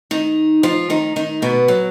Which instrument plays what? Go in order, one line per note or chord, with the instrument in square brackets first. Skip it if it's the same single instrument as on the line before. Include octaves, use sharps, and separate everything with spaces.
[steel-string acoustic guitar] D#3 D#4
F3 F4
D#3 D#4
D#3 D#4
B2 B3
F#3